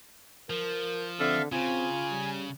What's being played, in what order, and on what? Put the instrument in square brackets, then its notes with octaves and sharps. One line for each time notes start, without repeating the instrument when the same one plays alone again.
[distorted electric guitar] F3 [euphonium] A#4
[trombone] D3 [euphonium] C4 [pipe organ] A4 E5 F5
[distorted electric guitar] C#3 [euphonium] C4 [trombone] F4 [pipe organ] G#5
[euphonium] G3